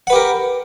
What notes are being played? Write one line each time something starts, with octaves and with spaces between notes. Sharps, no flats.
G4 A#4 B4 F#5